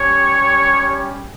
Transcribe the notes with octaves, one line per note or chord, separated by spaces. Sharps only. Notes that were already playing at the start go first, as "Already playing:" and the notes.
Already playing: G3 C#4 G4 C#5